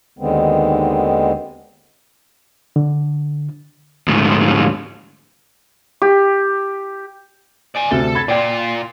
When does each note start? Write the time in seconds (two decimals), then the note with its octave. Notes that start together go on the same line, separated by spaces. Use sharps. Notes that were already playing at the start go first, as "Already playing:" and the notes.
0.19 D#2 D3 D#3 G#3 B3 C4
2.76 D3
4.08 D2 G#2
6.02 G4
7.76 D5 G#5
7.91 D2 C3 A4
8.15 B5 G#6 A6
8.28 A#2 F4 D5 G5